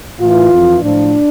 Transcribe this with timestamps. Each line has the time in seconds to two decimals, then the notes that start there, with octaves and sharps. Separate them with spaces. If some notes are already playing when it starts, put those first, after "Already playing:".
0.18 A2 E3 F4
0.50 F2 E3
0.82 A2 F3 D4